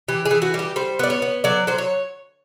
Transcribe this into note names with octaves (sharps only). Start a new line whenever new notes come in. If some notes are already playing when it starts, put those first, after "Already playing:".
E3 G4
G#4
E3
F#4
G3
G4
G3 C5
B3 D5
C#5
B3
F#3 D5
F#3 C5
C#5